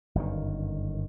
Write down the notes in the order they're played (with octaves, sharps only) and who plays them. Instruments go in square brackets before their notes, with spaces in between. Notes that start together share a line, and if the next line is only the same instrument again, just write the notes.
[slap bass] G1 F#2 B2 D#3